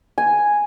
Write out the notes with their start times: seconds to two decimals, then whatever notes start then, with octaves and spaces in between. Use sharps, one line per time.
0.18 G#5